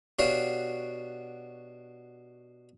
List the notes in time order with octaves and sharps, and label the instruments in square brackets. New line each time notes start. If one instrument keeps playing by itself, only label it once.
[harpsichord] B2 D4 F#4 G4 C#5 F5